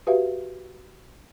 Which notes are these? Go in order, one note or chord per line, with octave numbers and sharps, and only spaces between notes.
F#4 G4 B4 E5 F5